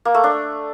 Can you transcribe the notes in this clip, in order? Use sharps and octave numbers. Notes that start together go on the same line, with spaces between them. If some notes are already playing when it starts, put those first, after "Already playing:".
A#3
A3
D4